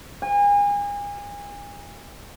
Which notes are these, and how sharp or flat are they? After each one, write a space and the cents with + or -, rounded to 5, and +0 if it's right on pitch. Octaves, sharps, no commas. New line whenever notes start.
G#5 -35